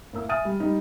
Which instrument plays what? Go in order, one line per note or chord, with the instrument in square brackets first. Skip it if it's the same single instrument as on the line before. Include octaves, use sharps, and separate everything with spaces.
[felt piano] A2 A#3 E6
E5 G#5 D#6 F6 A6 D#7
G3
G3 D#4